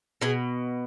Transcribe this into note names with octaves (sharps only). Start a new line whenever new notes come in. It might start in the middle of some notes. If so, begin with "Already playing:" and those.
B2 G#4